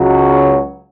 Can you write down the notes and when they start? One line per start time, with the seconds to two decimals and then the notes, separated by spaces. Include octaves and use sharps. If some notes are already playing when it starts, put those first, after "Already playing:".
Already playing: C#2 C#3 F#3